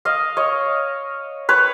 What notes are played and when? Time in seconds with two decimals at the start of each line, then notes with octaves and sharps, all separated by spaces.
0.05 D#5 F5
0.37 C#5 D#5
1.49 B4 C#5